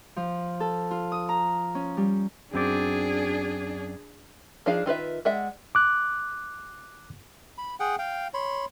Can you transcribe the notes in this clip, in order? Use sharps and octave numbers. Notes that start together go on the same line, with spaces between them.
F3
A4
F4
D#6
A#5
C#4
G3
F#2 C4 D4 G#4 D5
F3 D4 D#4 G#4 F5
D#3 F4 B4 E5
G#3 D5 E5 F#5
D6 F#6
B5
G#4 F#5 G5
F5 G5
C#5 B5 C6